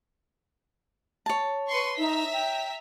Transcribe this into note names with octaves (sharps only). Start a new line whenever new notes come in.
C#5 A5
B4 C6 C#6
D#4 E5 A#5 B6
G5